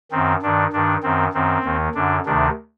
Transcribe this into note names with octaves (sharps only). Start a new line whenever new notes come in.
F#2 D#3 C4
G2 D#3 D4
G2 D#3 D4
F#2 D#3 C4
F#2 D#3 C4
D#2 D#3
F#2 D3 D4
D2 C3 D#3 D4